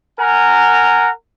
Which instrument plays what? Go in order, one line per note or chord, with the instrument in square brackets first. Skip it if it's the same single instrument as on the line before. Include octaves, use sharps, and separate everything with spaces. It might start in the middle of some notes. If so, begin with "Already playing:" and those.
[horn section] A#4 F#5 G#5 A#5